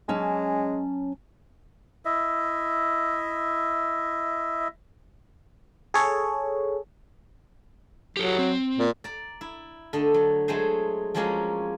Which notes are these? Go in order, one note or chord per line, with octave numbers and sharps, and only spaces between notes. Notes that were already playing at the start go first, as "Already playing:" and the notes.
F#3 G#3 C#4 A5
E4 D#5 E5
G#4 A4 C#5
F#3 G4 A4
C4
A#2
D5 A#5
E4
D3 A3 D#5
F#3
F#3 G#3 A3 G#4 C5 D#5
F3 F#3 G#3 A#3 C#4 F#4